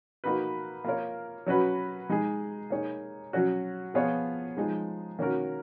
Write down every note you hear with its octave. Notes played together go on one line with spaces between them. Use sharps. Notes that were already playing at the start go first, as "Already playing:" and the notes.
A#3 D#4 F#4 B4
A#3 F4 A#4 C#5
F#3 C#4 F#4 B4
G#3 D#4 G#4
A#3 D#4 G#4 C#5
F#3 C#4 F#4
F3 B3 F4 G#4 C#5
F3 G#3 D#4 G#4
D#3 A#3 C#4 F#4 A#4